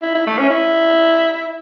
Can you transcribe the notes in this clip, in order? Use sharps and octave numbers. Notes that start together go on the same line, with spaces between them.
E4
E4
A3
C#4
E4